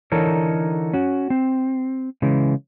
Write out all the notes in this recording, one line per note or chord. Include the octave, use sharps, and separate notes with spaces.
D3 E3 D#4 A4 A#4 C#5
C#4 F#4
C4
C#3 E3 G#3